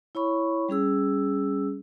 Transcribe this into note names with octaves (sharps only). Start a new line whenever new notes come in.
E4 C#5 B5 C#6
G3 C#4 G#4 E6